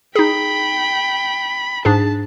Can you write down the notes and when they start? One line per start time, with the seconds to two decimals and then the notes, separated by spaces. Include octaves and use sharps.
0.15 D#4 G#4 G5 B5
1.85 G#2 D4 G#4 A5